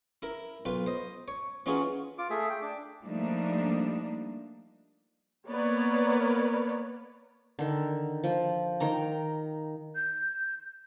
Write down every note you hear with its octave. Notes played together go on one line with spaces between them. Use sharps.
E4 A#4
B1 F4 B4
C5 D#5
C#5
E3 C#4 D#4 F4 F#4 G#4
F4 D6
A3 G#4 E5
G5
D4 D6
F3 G3 A3 A#3 D4 D#4
A#3 B3 A#4 B4 C#5 D5
D3 D#3
F3
D#3 G5 A#5
G6